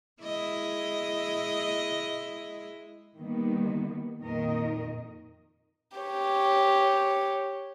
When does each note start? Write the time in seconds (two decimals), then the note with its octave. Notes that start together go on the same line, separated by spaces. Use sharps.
0.23 G#3 E4 D#5
3.16 D#3 G3 A#3 B3
4.21 F2 A#2 D#3 A#4 D#5
5.98 G4 C#5